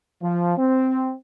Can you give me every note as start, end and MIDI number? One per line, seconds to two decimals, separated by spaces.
0.21 0.52 53
0.58 1.13 60